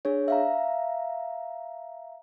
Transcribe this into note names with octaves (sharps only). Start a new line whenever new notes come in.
D4 G#4 C#5
E5 F5 A#5